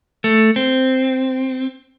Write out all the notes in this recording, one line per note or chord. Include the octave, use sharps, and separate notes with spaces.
A3
C4